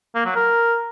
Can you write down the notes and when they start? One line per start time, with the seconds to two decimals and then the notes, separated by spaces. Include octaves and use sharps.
0.15 A#3
0.26 F#3
0.36 A#4